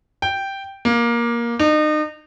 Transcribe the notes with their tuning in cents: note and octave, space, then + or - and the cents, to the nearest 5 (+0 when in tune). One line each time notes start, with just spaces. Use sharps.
G5 -5
A#3 +15
D#4 -35